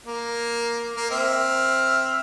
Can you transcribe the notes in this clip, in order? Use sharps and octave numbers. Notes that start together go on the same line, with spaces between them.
A#3
A#3
C4 E5 F6